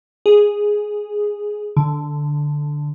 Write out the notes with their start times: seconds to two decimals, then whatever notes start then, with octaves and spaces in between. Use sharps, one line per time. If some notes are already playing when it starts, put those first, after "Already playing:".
0.26 G#4
1.77 D3